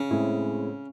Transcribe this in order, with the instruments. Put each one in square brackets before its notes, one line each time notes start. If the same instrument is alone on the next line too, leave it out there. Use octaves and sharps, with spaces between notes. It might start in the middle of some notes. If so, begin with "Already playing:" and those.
Already playing: [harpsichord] C#3
[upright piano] A2 G#3 C4 E4